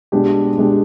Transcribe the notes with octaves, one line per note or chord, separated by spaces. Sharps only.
B2 G#3 D4 G4
B2 G#3 D4 G4